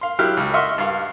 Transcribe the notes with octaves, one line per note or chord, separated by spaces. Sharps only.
F5 C6
F#3 E4 G4 F6 F#6
C#2
D#5 E5 F#5 C6 C#6 F6
G2 F5